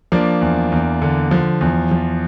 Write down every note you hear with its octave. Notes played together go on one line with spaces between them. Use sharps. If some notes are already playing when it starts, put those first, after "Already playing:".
F3 A#3 D4
E2
E2
D3
F3
E2
F3